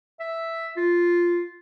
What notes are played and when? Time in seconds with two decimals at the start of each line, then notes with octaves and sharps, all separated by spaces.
0.20 E5
0.77 F4